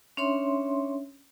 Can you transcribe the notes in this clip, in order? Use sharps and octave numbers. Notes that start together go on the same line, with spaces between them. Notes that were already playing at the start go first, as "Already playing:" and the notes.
C#4 D4 C#5 E5 C6